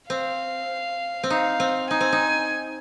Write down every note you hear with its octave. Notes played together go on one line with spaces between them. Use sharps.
C4 F5
C4
D#4 F5
C4
D#4 G#5
C4
D#4